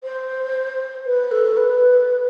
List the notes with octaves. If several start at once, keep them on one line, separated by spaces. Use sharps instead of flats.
C5
B4
A4
B4